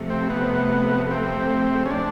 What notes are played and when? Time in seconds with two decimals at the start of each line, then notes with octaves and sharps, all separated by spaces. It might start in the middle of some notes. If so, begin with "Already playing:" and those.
Already playing: C3 F3 A3
0.10 C4
0.30 B3
1.11 C4
1.86 C#4
1.91 D4